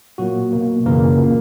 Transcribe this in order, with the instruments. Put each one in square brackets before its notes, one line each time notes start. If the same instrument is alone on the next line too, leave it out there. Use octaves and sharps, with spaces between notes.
[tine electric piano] A#2 F#3 A#3 F#4
B2 A#3
F#2 C#3 E3 A#3 A#4
A#2 A#3